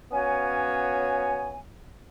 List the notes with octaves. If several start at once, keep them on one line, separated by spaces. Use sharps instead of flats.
B3 C#4 F#4 C#5 F5 G#5